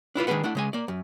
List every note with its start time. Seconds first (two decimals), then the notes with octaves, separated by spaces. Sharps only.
0.15 D4 E4 F4 B4
0.27 D#3 G#3 D4 G#4 B4 F#5
0.44 A3 D4 E4 F#5
0.55 C#3 G#3 G#5
0.73 A#3 D5
0.88 F#2